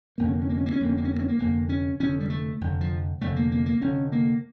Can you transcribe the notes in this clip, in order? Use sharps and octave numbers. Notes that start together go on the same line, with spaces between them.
F1 F2 D3 A#3
C#4
A#3
C#4
A#3
C#4
A#3
C#4
F1 F2 D3 A#3
C#4
A#3
C#4
A#3
C#4
A#3
F1 F2 D3 A#3
C#4
F1 F2 D3 C#4
G3
A3
F1 F2 D3
F3
F1 F2 D3 A3
A#3
A#3
A#3
F1 F2 D3 C#4
A#3